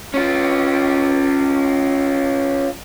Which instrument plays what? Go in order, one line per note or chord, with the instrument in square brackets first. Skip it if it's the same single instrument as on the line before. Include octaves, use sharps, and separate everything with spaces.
[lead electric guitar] C#4 F4